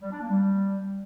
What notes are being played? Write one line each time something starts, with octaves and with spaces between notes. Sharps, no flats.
G3
D4
A#3
G3